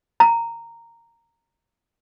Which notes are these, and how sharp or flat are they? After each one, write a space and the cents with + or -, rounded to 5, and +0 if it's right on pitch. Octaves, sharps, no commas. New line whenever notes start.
A#5 -10